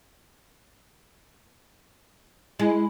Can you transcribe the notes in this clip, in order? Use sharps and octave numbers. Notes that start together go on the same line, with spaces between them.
G#3 E4